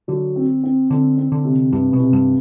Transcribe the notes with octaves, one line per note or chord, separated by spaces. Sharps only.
D3 F#3
C4
C4
D3 C4
C4
D3
C3
G2 C3
B2
C3
G2